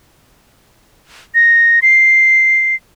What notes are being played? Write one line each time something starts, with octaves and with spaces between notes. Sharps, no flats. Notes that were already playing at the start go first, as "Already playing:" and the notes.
A#6
C7